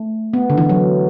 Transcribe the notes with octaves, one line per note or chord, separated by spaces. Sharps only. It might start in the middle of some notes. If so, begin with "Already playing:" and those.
Already playing: A3
B3
D3
E3
F#3